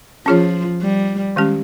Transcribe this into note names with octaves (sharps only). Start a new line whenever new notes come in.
F3 C#4 F4 G#4 C#5
G3
D#3 G#3 C#4 G4